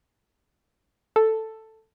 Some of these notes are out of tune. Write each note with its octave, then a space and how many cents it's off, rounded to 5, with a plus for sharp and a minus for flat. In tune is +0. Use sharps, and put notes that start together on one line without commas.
A4 +5